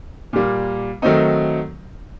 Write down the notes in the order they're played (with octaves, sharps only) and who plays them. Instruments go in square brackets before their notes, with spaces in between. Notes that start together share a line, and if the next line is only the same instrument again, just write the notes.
[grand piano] A#2 G3 A#3
D#3 F#3 A3 C4 D#4